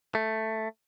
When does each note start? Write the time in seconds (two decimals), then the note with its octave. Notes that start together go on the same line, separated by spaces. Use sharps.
0.15 A3